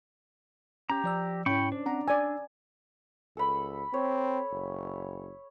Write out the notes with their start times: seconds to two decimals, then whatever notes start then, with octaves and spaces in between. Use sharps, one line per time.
0.90 C#4 G4 A#5
1.04 F3 D5 E6
1.46 G#2 C#4 E4 G5 B5 C#6
1.72 D4 C5
1.86 C4 F#5 A#5
2.08 D5 G#5 E6
3.37 C#2 A4 B5
3.94 C4 C#5
4.52 F#1